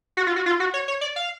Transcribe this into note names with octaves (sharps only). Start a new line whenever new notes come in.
F#4
F4
F#4
F4
F#4
C#5
C#5
D5
F5